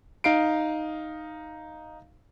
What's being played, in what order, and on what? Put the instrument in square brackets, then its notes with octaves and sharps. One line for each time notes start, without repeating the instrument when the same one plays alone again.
[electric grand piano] D#4 F5 C7 D7